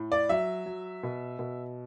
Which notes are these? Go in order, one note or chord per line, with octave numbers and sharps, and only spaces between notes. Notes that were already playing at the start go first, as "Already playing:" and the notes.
Already playing: A2
D5
F#3 E5
F#3
B2
B2